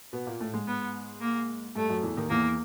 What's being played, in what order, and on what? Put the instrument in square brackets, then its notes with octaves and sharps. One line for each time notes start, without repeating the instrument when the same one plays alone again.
[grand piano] B2 B3
A#2 A#3
A2 A3
G#2 G#3
[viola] B3
A#3
[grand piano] G2 G3 [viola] A3
[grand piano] F#2 F#3
E2 E3
D#2 D#3
[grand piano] E2 E3 [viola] A#3